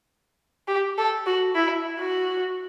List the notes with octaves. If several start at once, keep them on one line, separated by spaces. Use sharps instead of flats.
G4
A4
F#4
E4
F#4